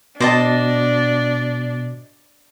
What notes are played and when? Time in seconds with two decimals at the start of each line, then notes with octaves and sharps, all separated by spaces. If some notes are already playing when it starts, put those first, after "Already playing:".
0.20 B2 D4 C5 D#5 A5 D6 A#6